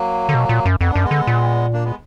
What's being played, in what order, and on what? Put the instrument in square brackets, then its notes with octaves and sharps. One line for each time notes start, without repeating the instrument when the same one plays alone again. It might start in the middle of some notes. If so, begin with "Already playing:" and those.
Already playing: [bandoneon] F#3 A#3
[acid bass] D3
B2
A#2
F#2
[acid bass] F2 [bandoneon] B3
[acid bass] F#2 [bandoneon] D4
[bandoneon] G#3 B3
[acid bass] D3
A#2
[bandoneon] A#3 D4
G#3 B3